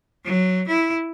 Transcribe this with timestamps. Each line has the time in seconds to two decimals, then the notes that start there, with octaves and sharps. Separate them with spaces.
0.25 F#3
0.68 E4